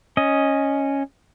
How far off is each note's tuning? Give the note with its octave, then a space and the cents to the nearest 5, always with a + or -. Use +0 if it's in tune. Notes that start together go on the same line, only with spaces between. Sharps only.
C#4 -5 D#5 +0